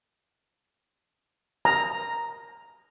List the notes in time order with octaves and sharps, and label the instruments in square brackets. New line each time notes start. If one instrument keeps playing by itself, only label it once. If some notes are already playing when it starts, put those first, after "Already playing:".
[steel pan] A#5